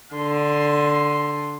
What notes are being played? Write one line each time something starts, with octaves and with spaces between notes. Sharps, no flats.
D3 C6